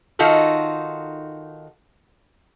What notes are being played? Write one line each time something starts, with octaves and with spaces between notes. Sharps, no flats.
D#3 D#4 F4 F#4 A4